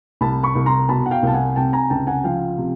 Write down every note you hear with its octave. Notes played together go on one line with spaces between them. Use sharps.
C2 A5 B5
B5 C#6
C2
A#5 C6
B2 A5 B5
F#5
F5 G5
C2 A5
F#5 G#5
C3 G5 A5
G#5 A#5
C#2 G5 A5
F#5 G#5
F3 F5 G5
C3